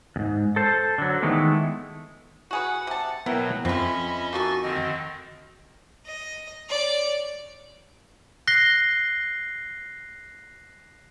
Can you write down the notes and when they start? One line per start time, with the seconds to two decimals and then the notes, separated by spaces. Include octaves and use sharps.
0.16 E2 G#2
0.56 A4 C5
0.98 D3 F#3
1.23 D#3 E3 G#3 A3 B3
2.51 F#4 G#4 B4 F#5
2.87 C3 A5
3.26 B2 F#3 B3 E4 A#4 G5
3.65 F2 C4 C#4 F4 D#5 E5 B5
4.33 A#3 D#4 F#4 A4 G#5 C#6 A6
4.62 D3 D#3 C4 D#5
6.06 D#5
6.69 C#5 D5
8.47 F#6 A#6 C7 G7